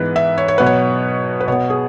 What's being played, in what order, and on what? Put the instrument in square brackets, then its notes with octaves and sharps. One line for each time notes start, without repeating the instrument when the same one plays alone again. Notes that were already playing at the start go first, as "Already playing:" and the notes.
Already playing: [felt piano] G#2 E3 B3 B4
E5
C#5
C#5
B2 F#3 B3 B4
C#5
B4
B2 C#5
B3
G#4